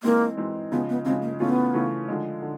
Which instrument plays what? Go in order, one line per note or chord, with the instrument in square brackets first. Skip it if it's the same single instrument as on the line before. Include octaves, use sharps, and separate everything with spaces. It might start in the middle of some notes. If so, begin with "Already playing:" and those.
[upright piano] E3 G#3 C4 D#4 [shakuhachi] A#3
[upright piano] E3 G#3 C4 D#4
[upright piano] C#3 F3 G#3 [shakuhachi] B3
[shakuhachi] B3
[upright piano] C#3 F3 G#3 [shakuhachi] C4
[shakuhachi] A#3
[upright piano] C#3 E3 A3 C#4 F4 [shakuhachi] B3
[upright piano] C#3 E3 A3 C#4 F4
D3 F3 G#3
D3